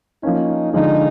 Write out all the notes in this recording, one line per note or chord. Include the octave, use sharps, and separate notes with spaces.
F3 A#3 C#4 D#4
D3 F3 G#3 D#4